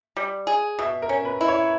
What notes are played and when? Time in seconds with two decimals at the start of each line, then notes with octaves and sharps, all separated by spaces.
0.17 G3
0.47 G#4
0.79 B2 E5
1.02 A#4
1.09 C#4
1.25 B4
1.41 E4
1.48 C#5